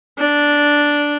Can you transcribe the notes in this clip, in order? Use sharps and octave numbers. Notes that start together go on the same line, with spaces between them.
D4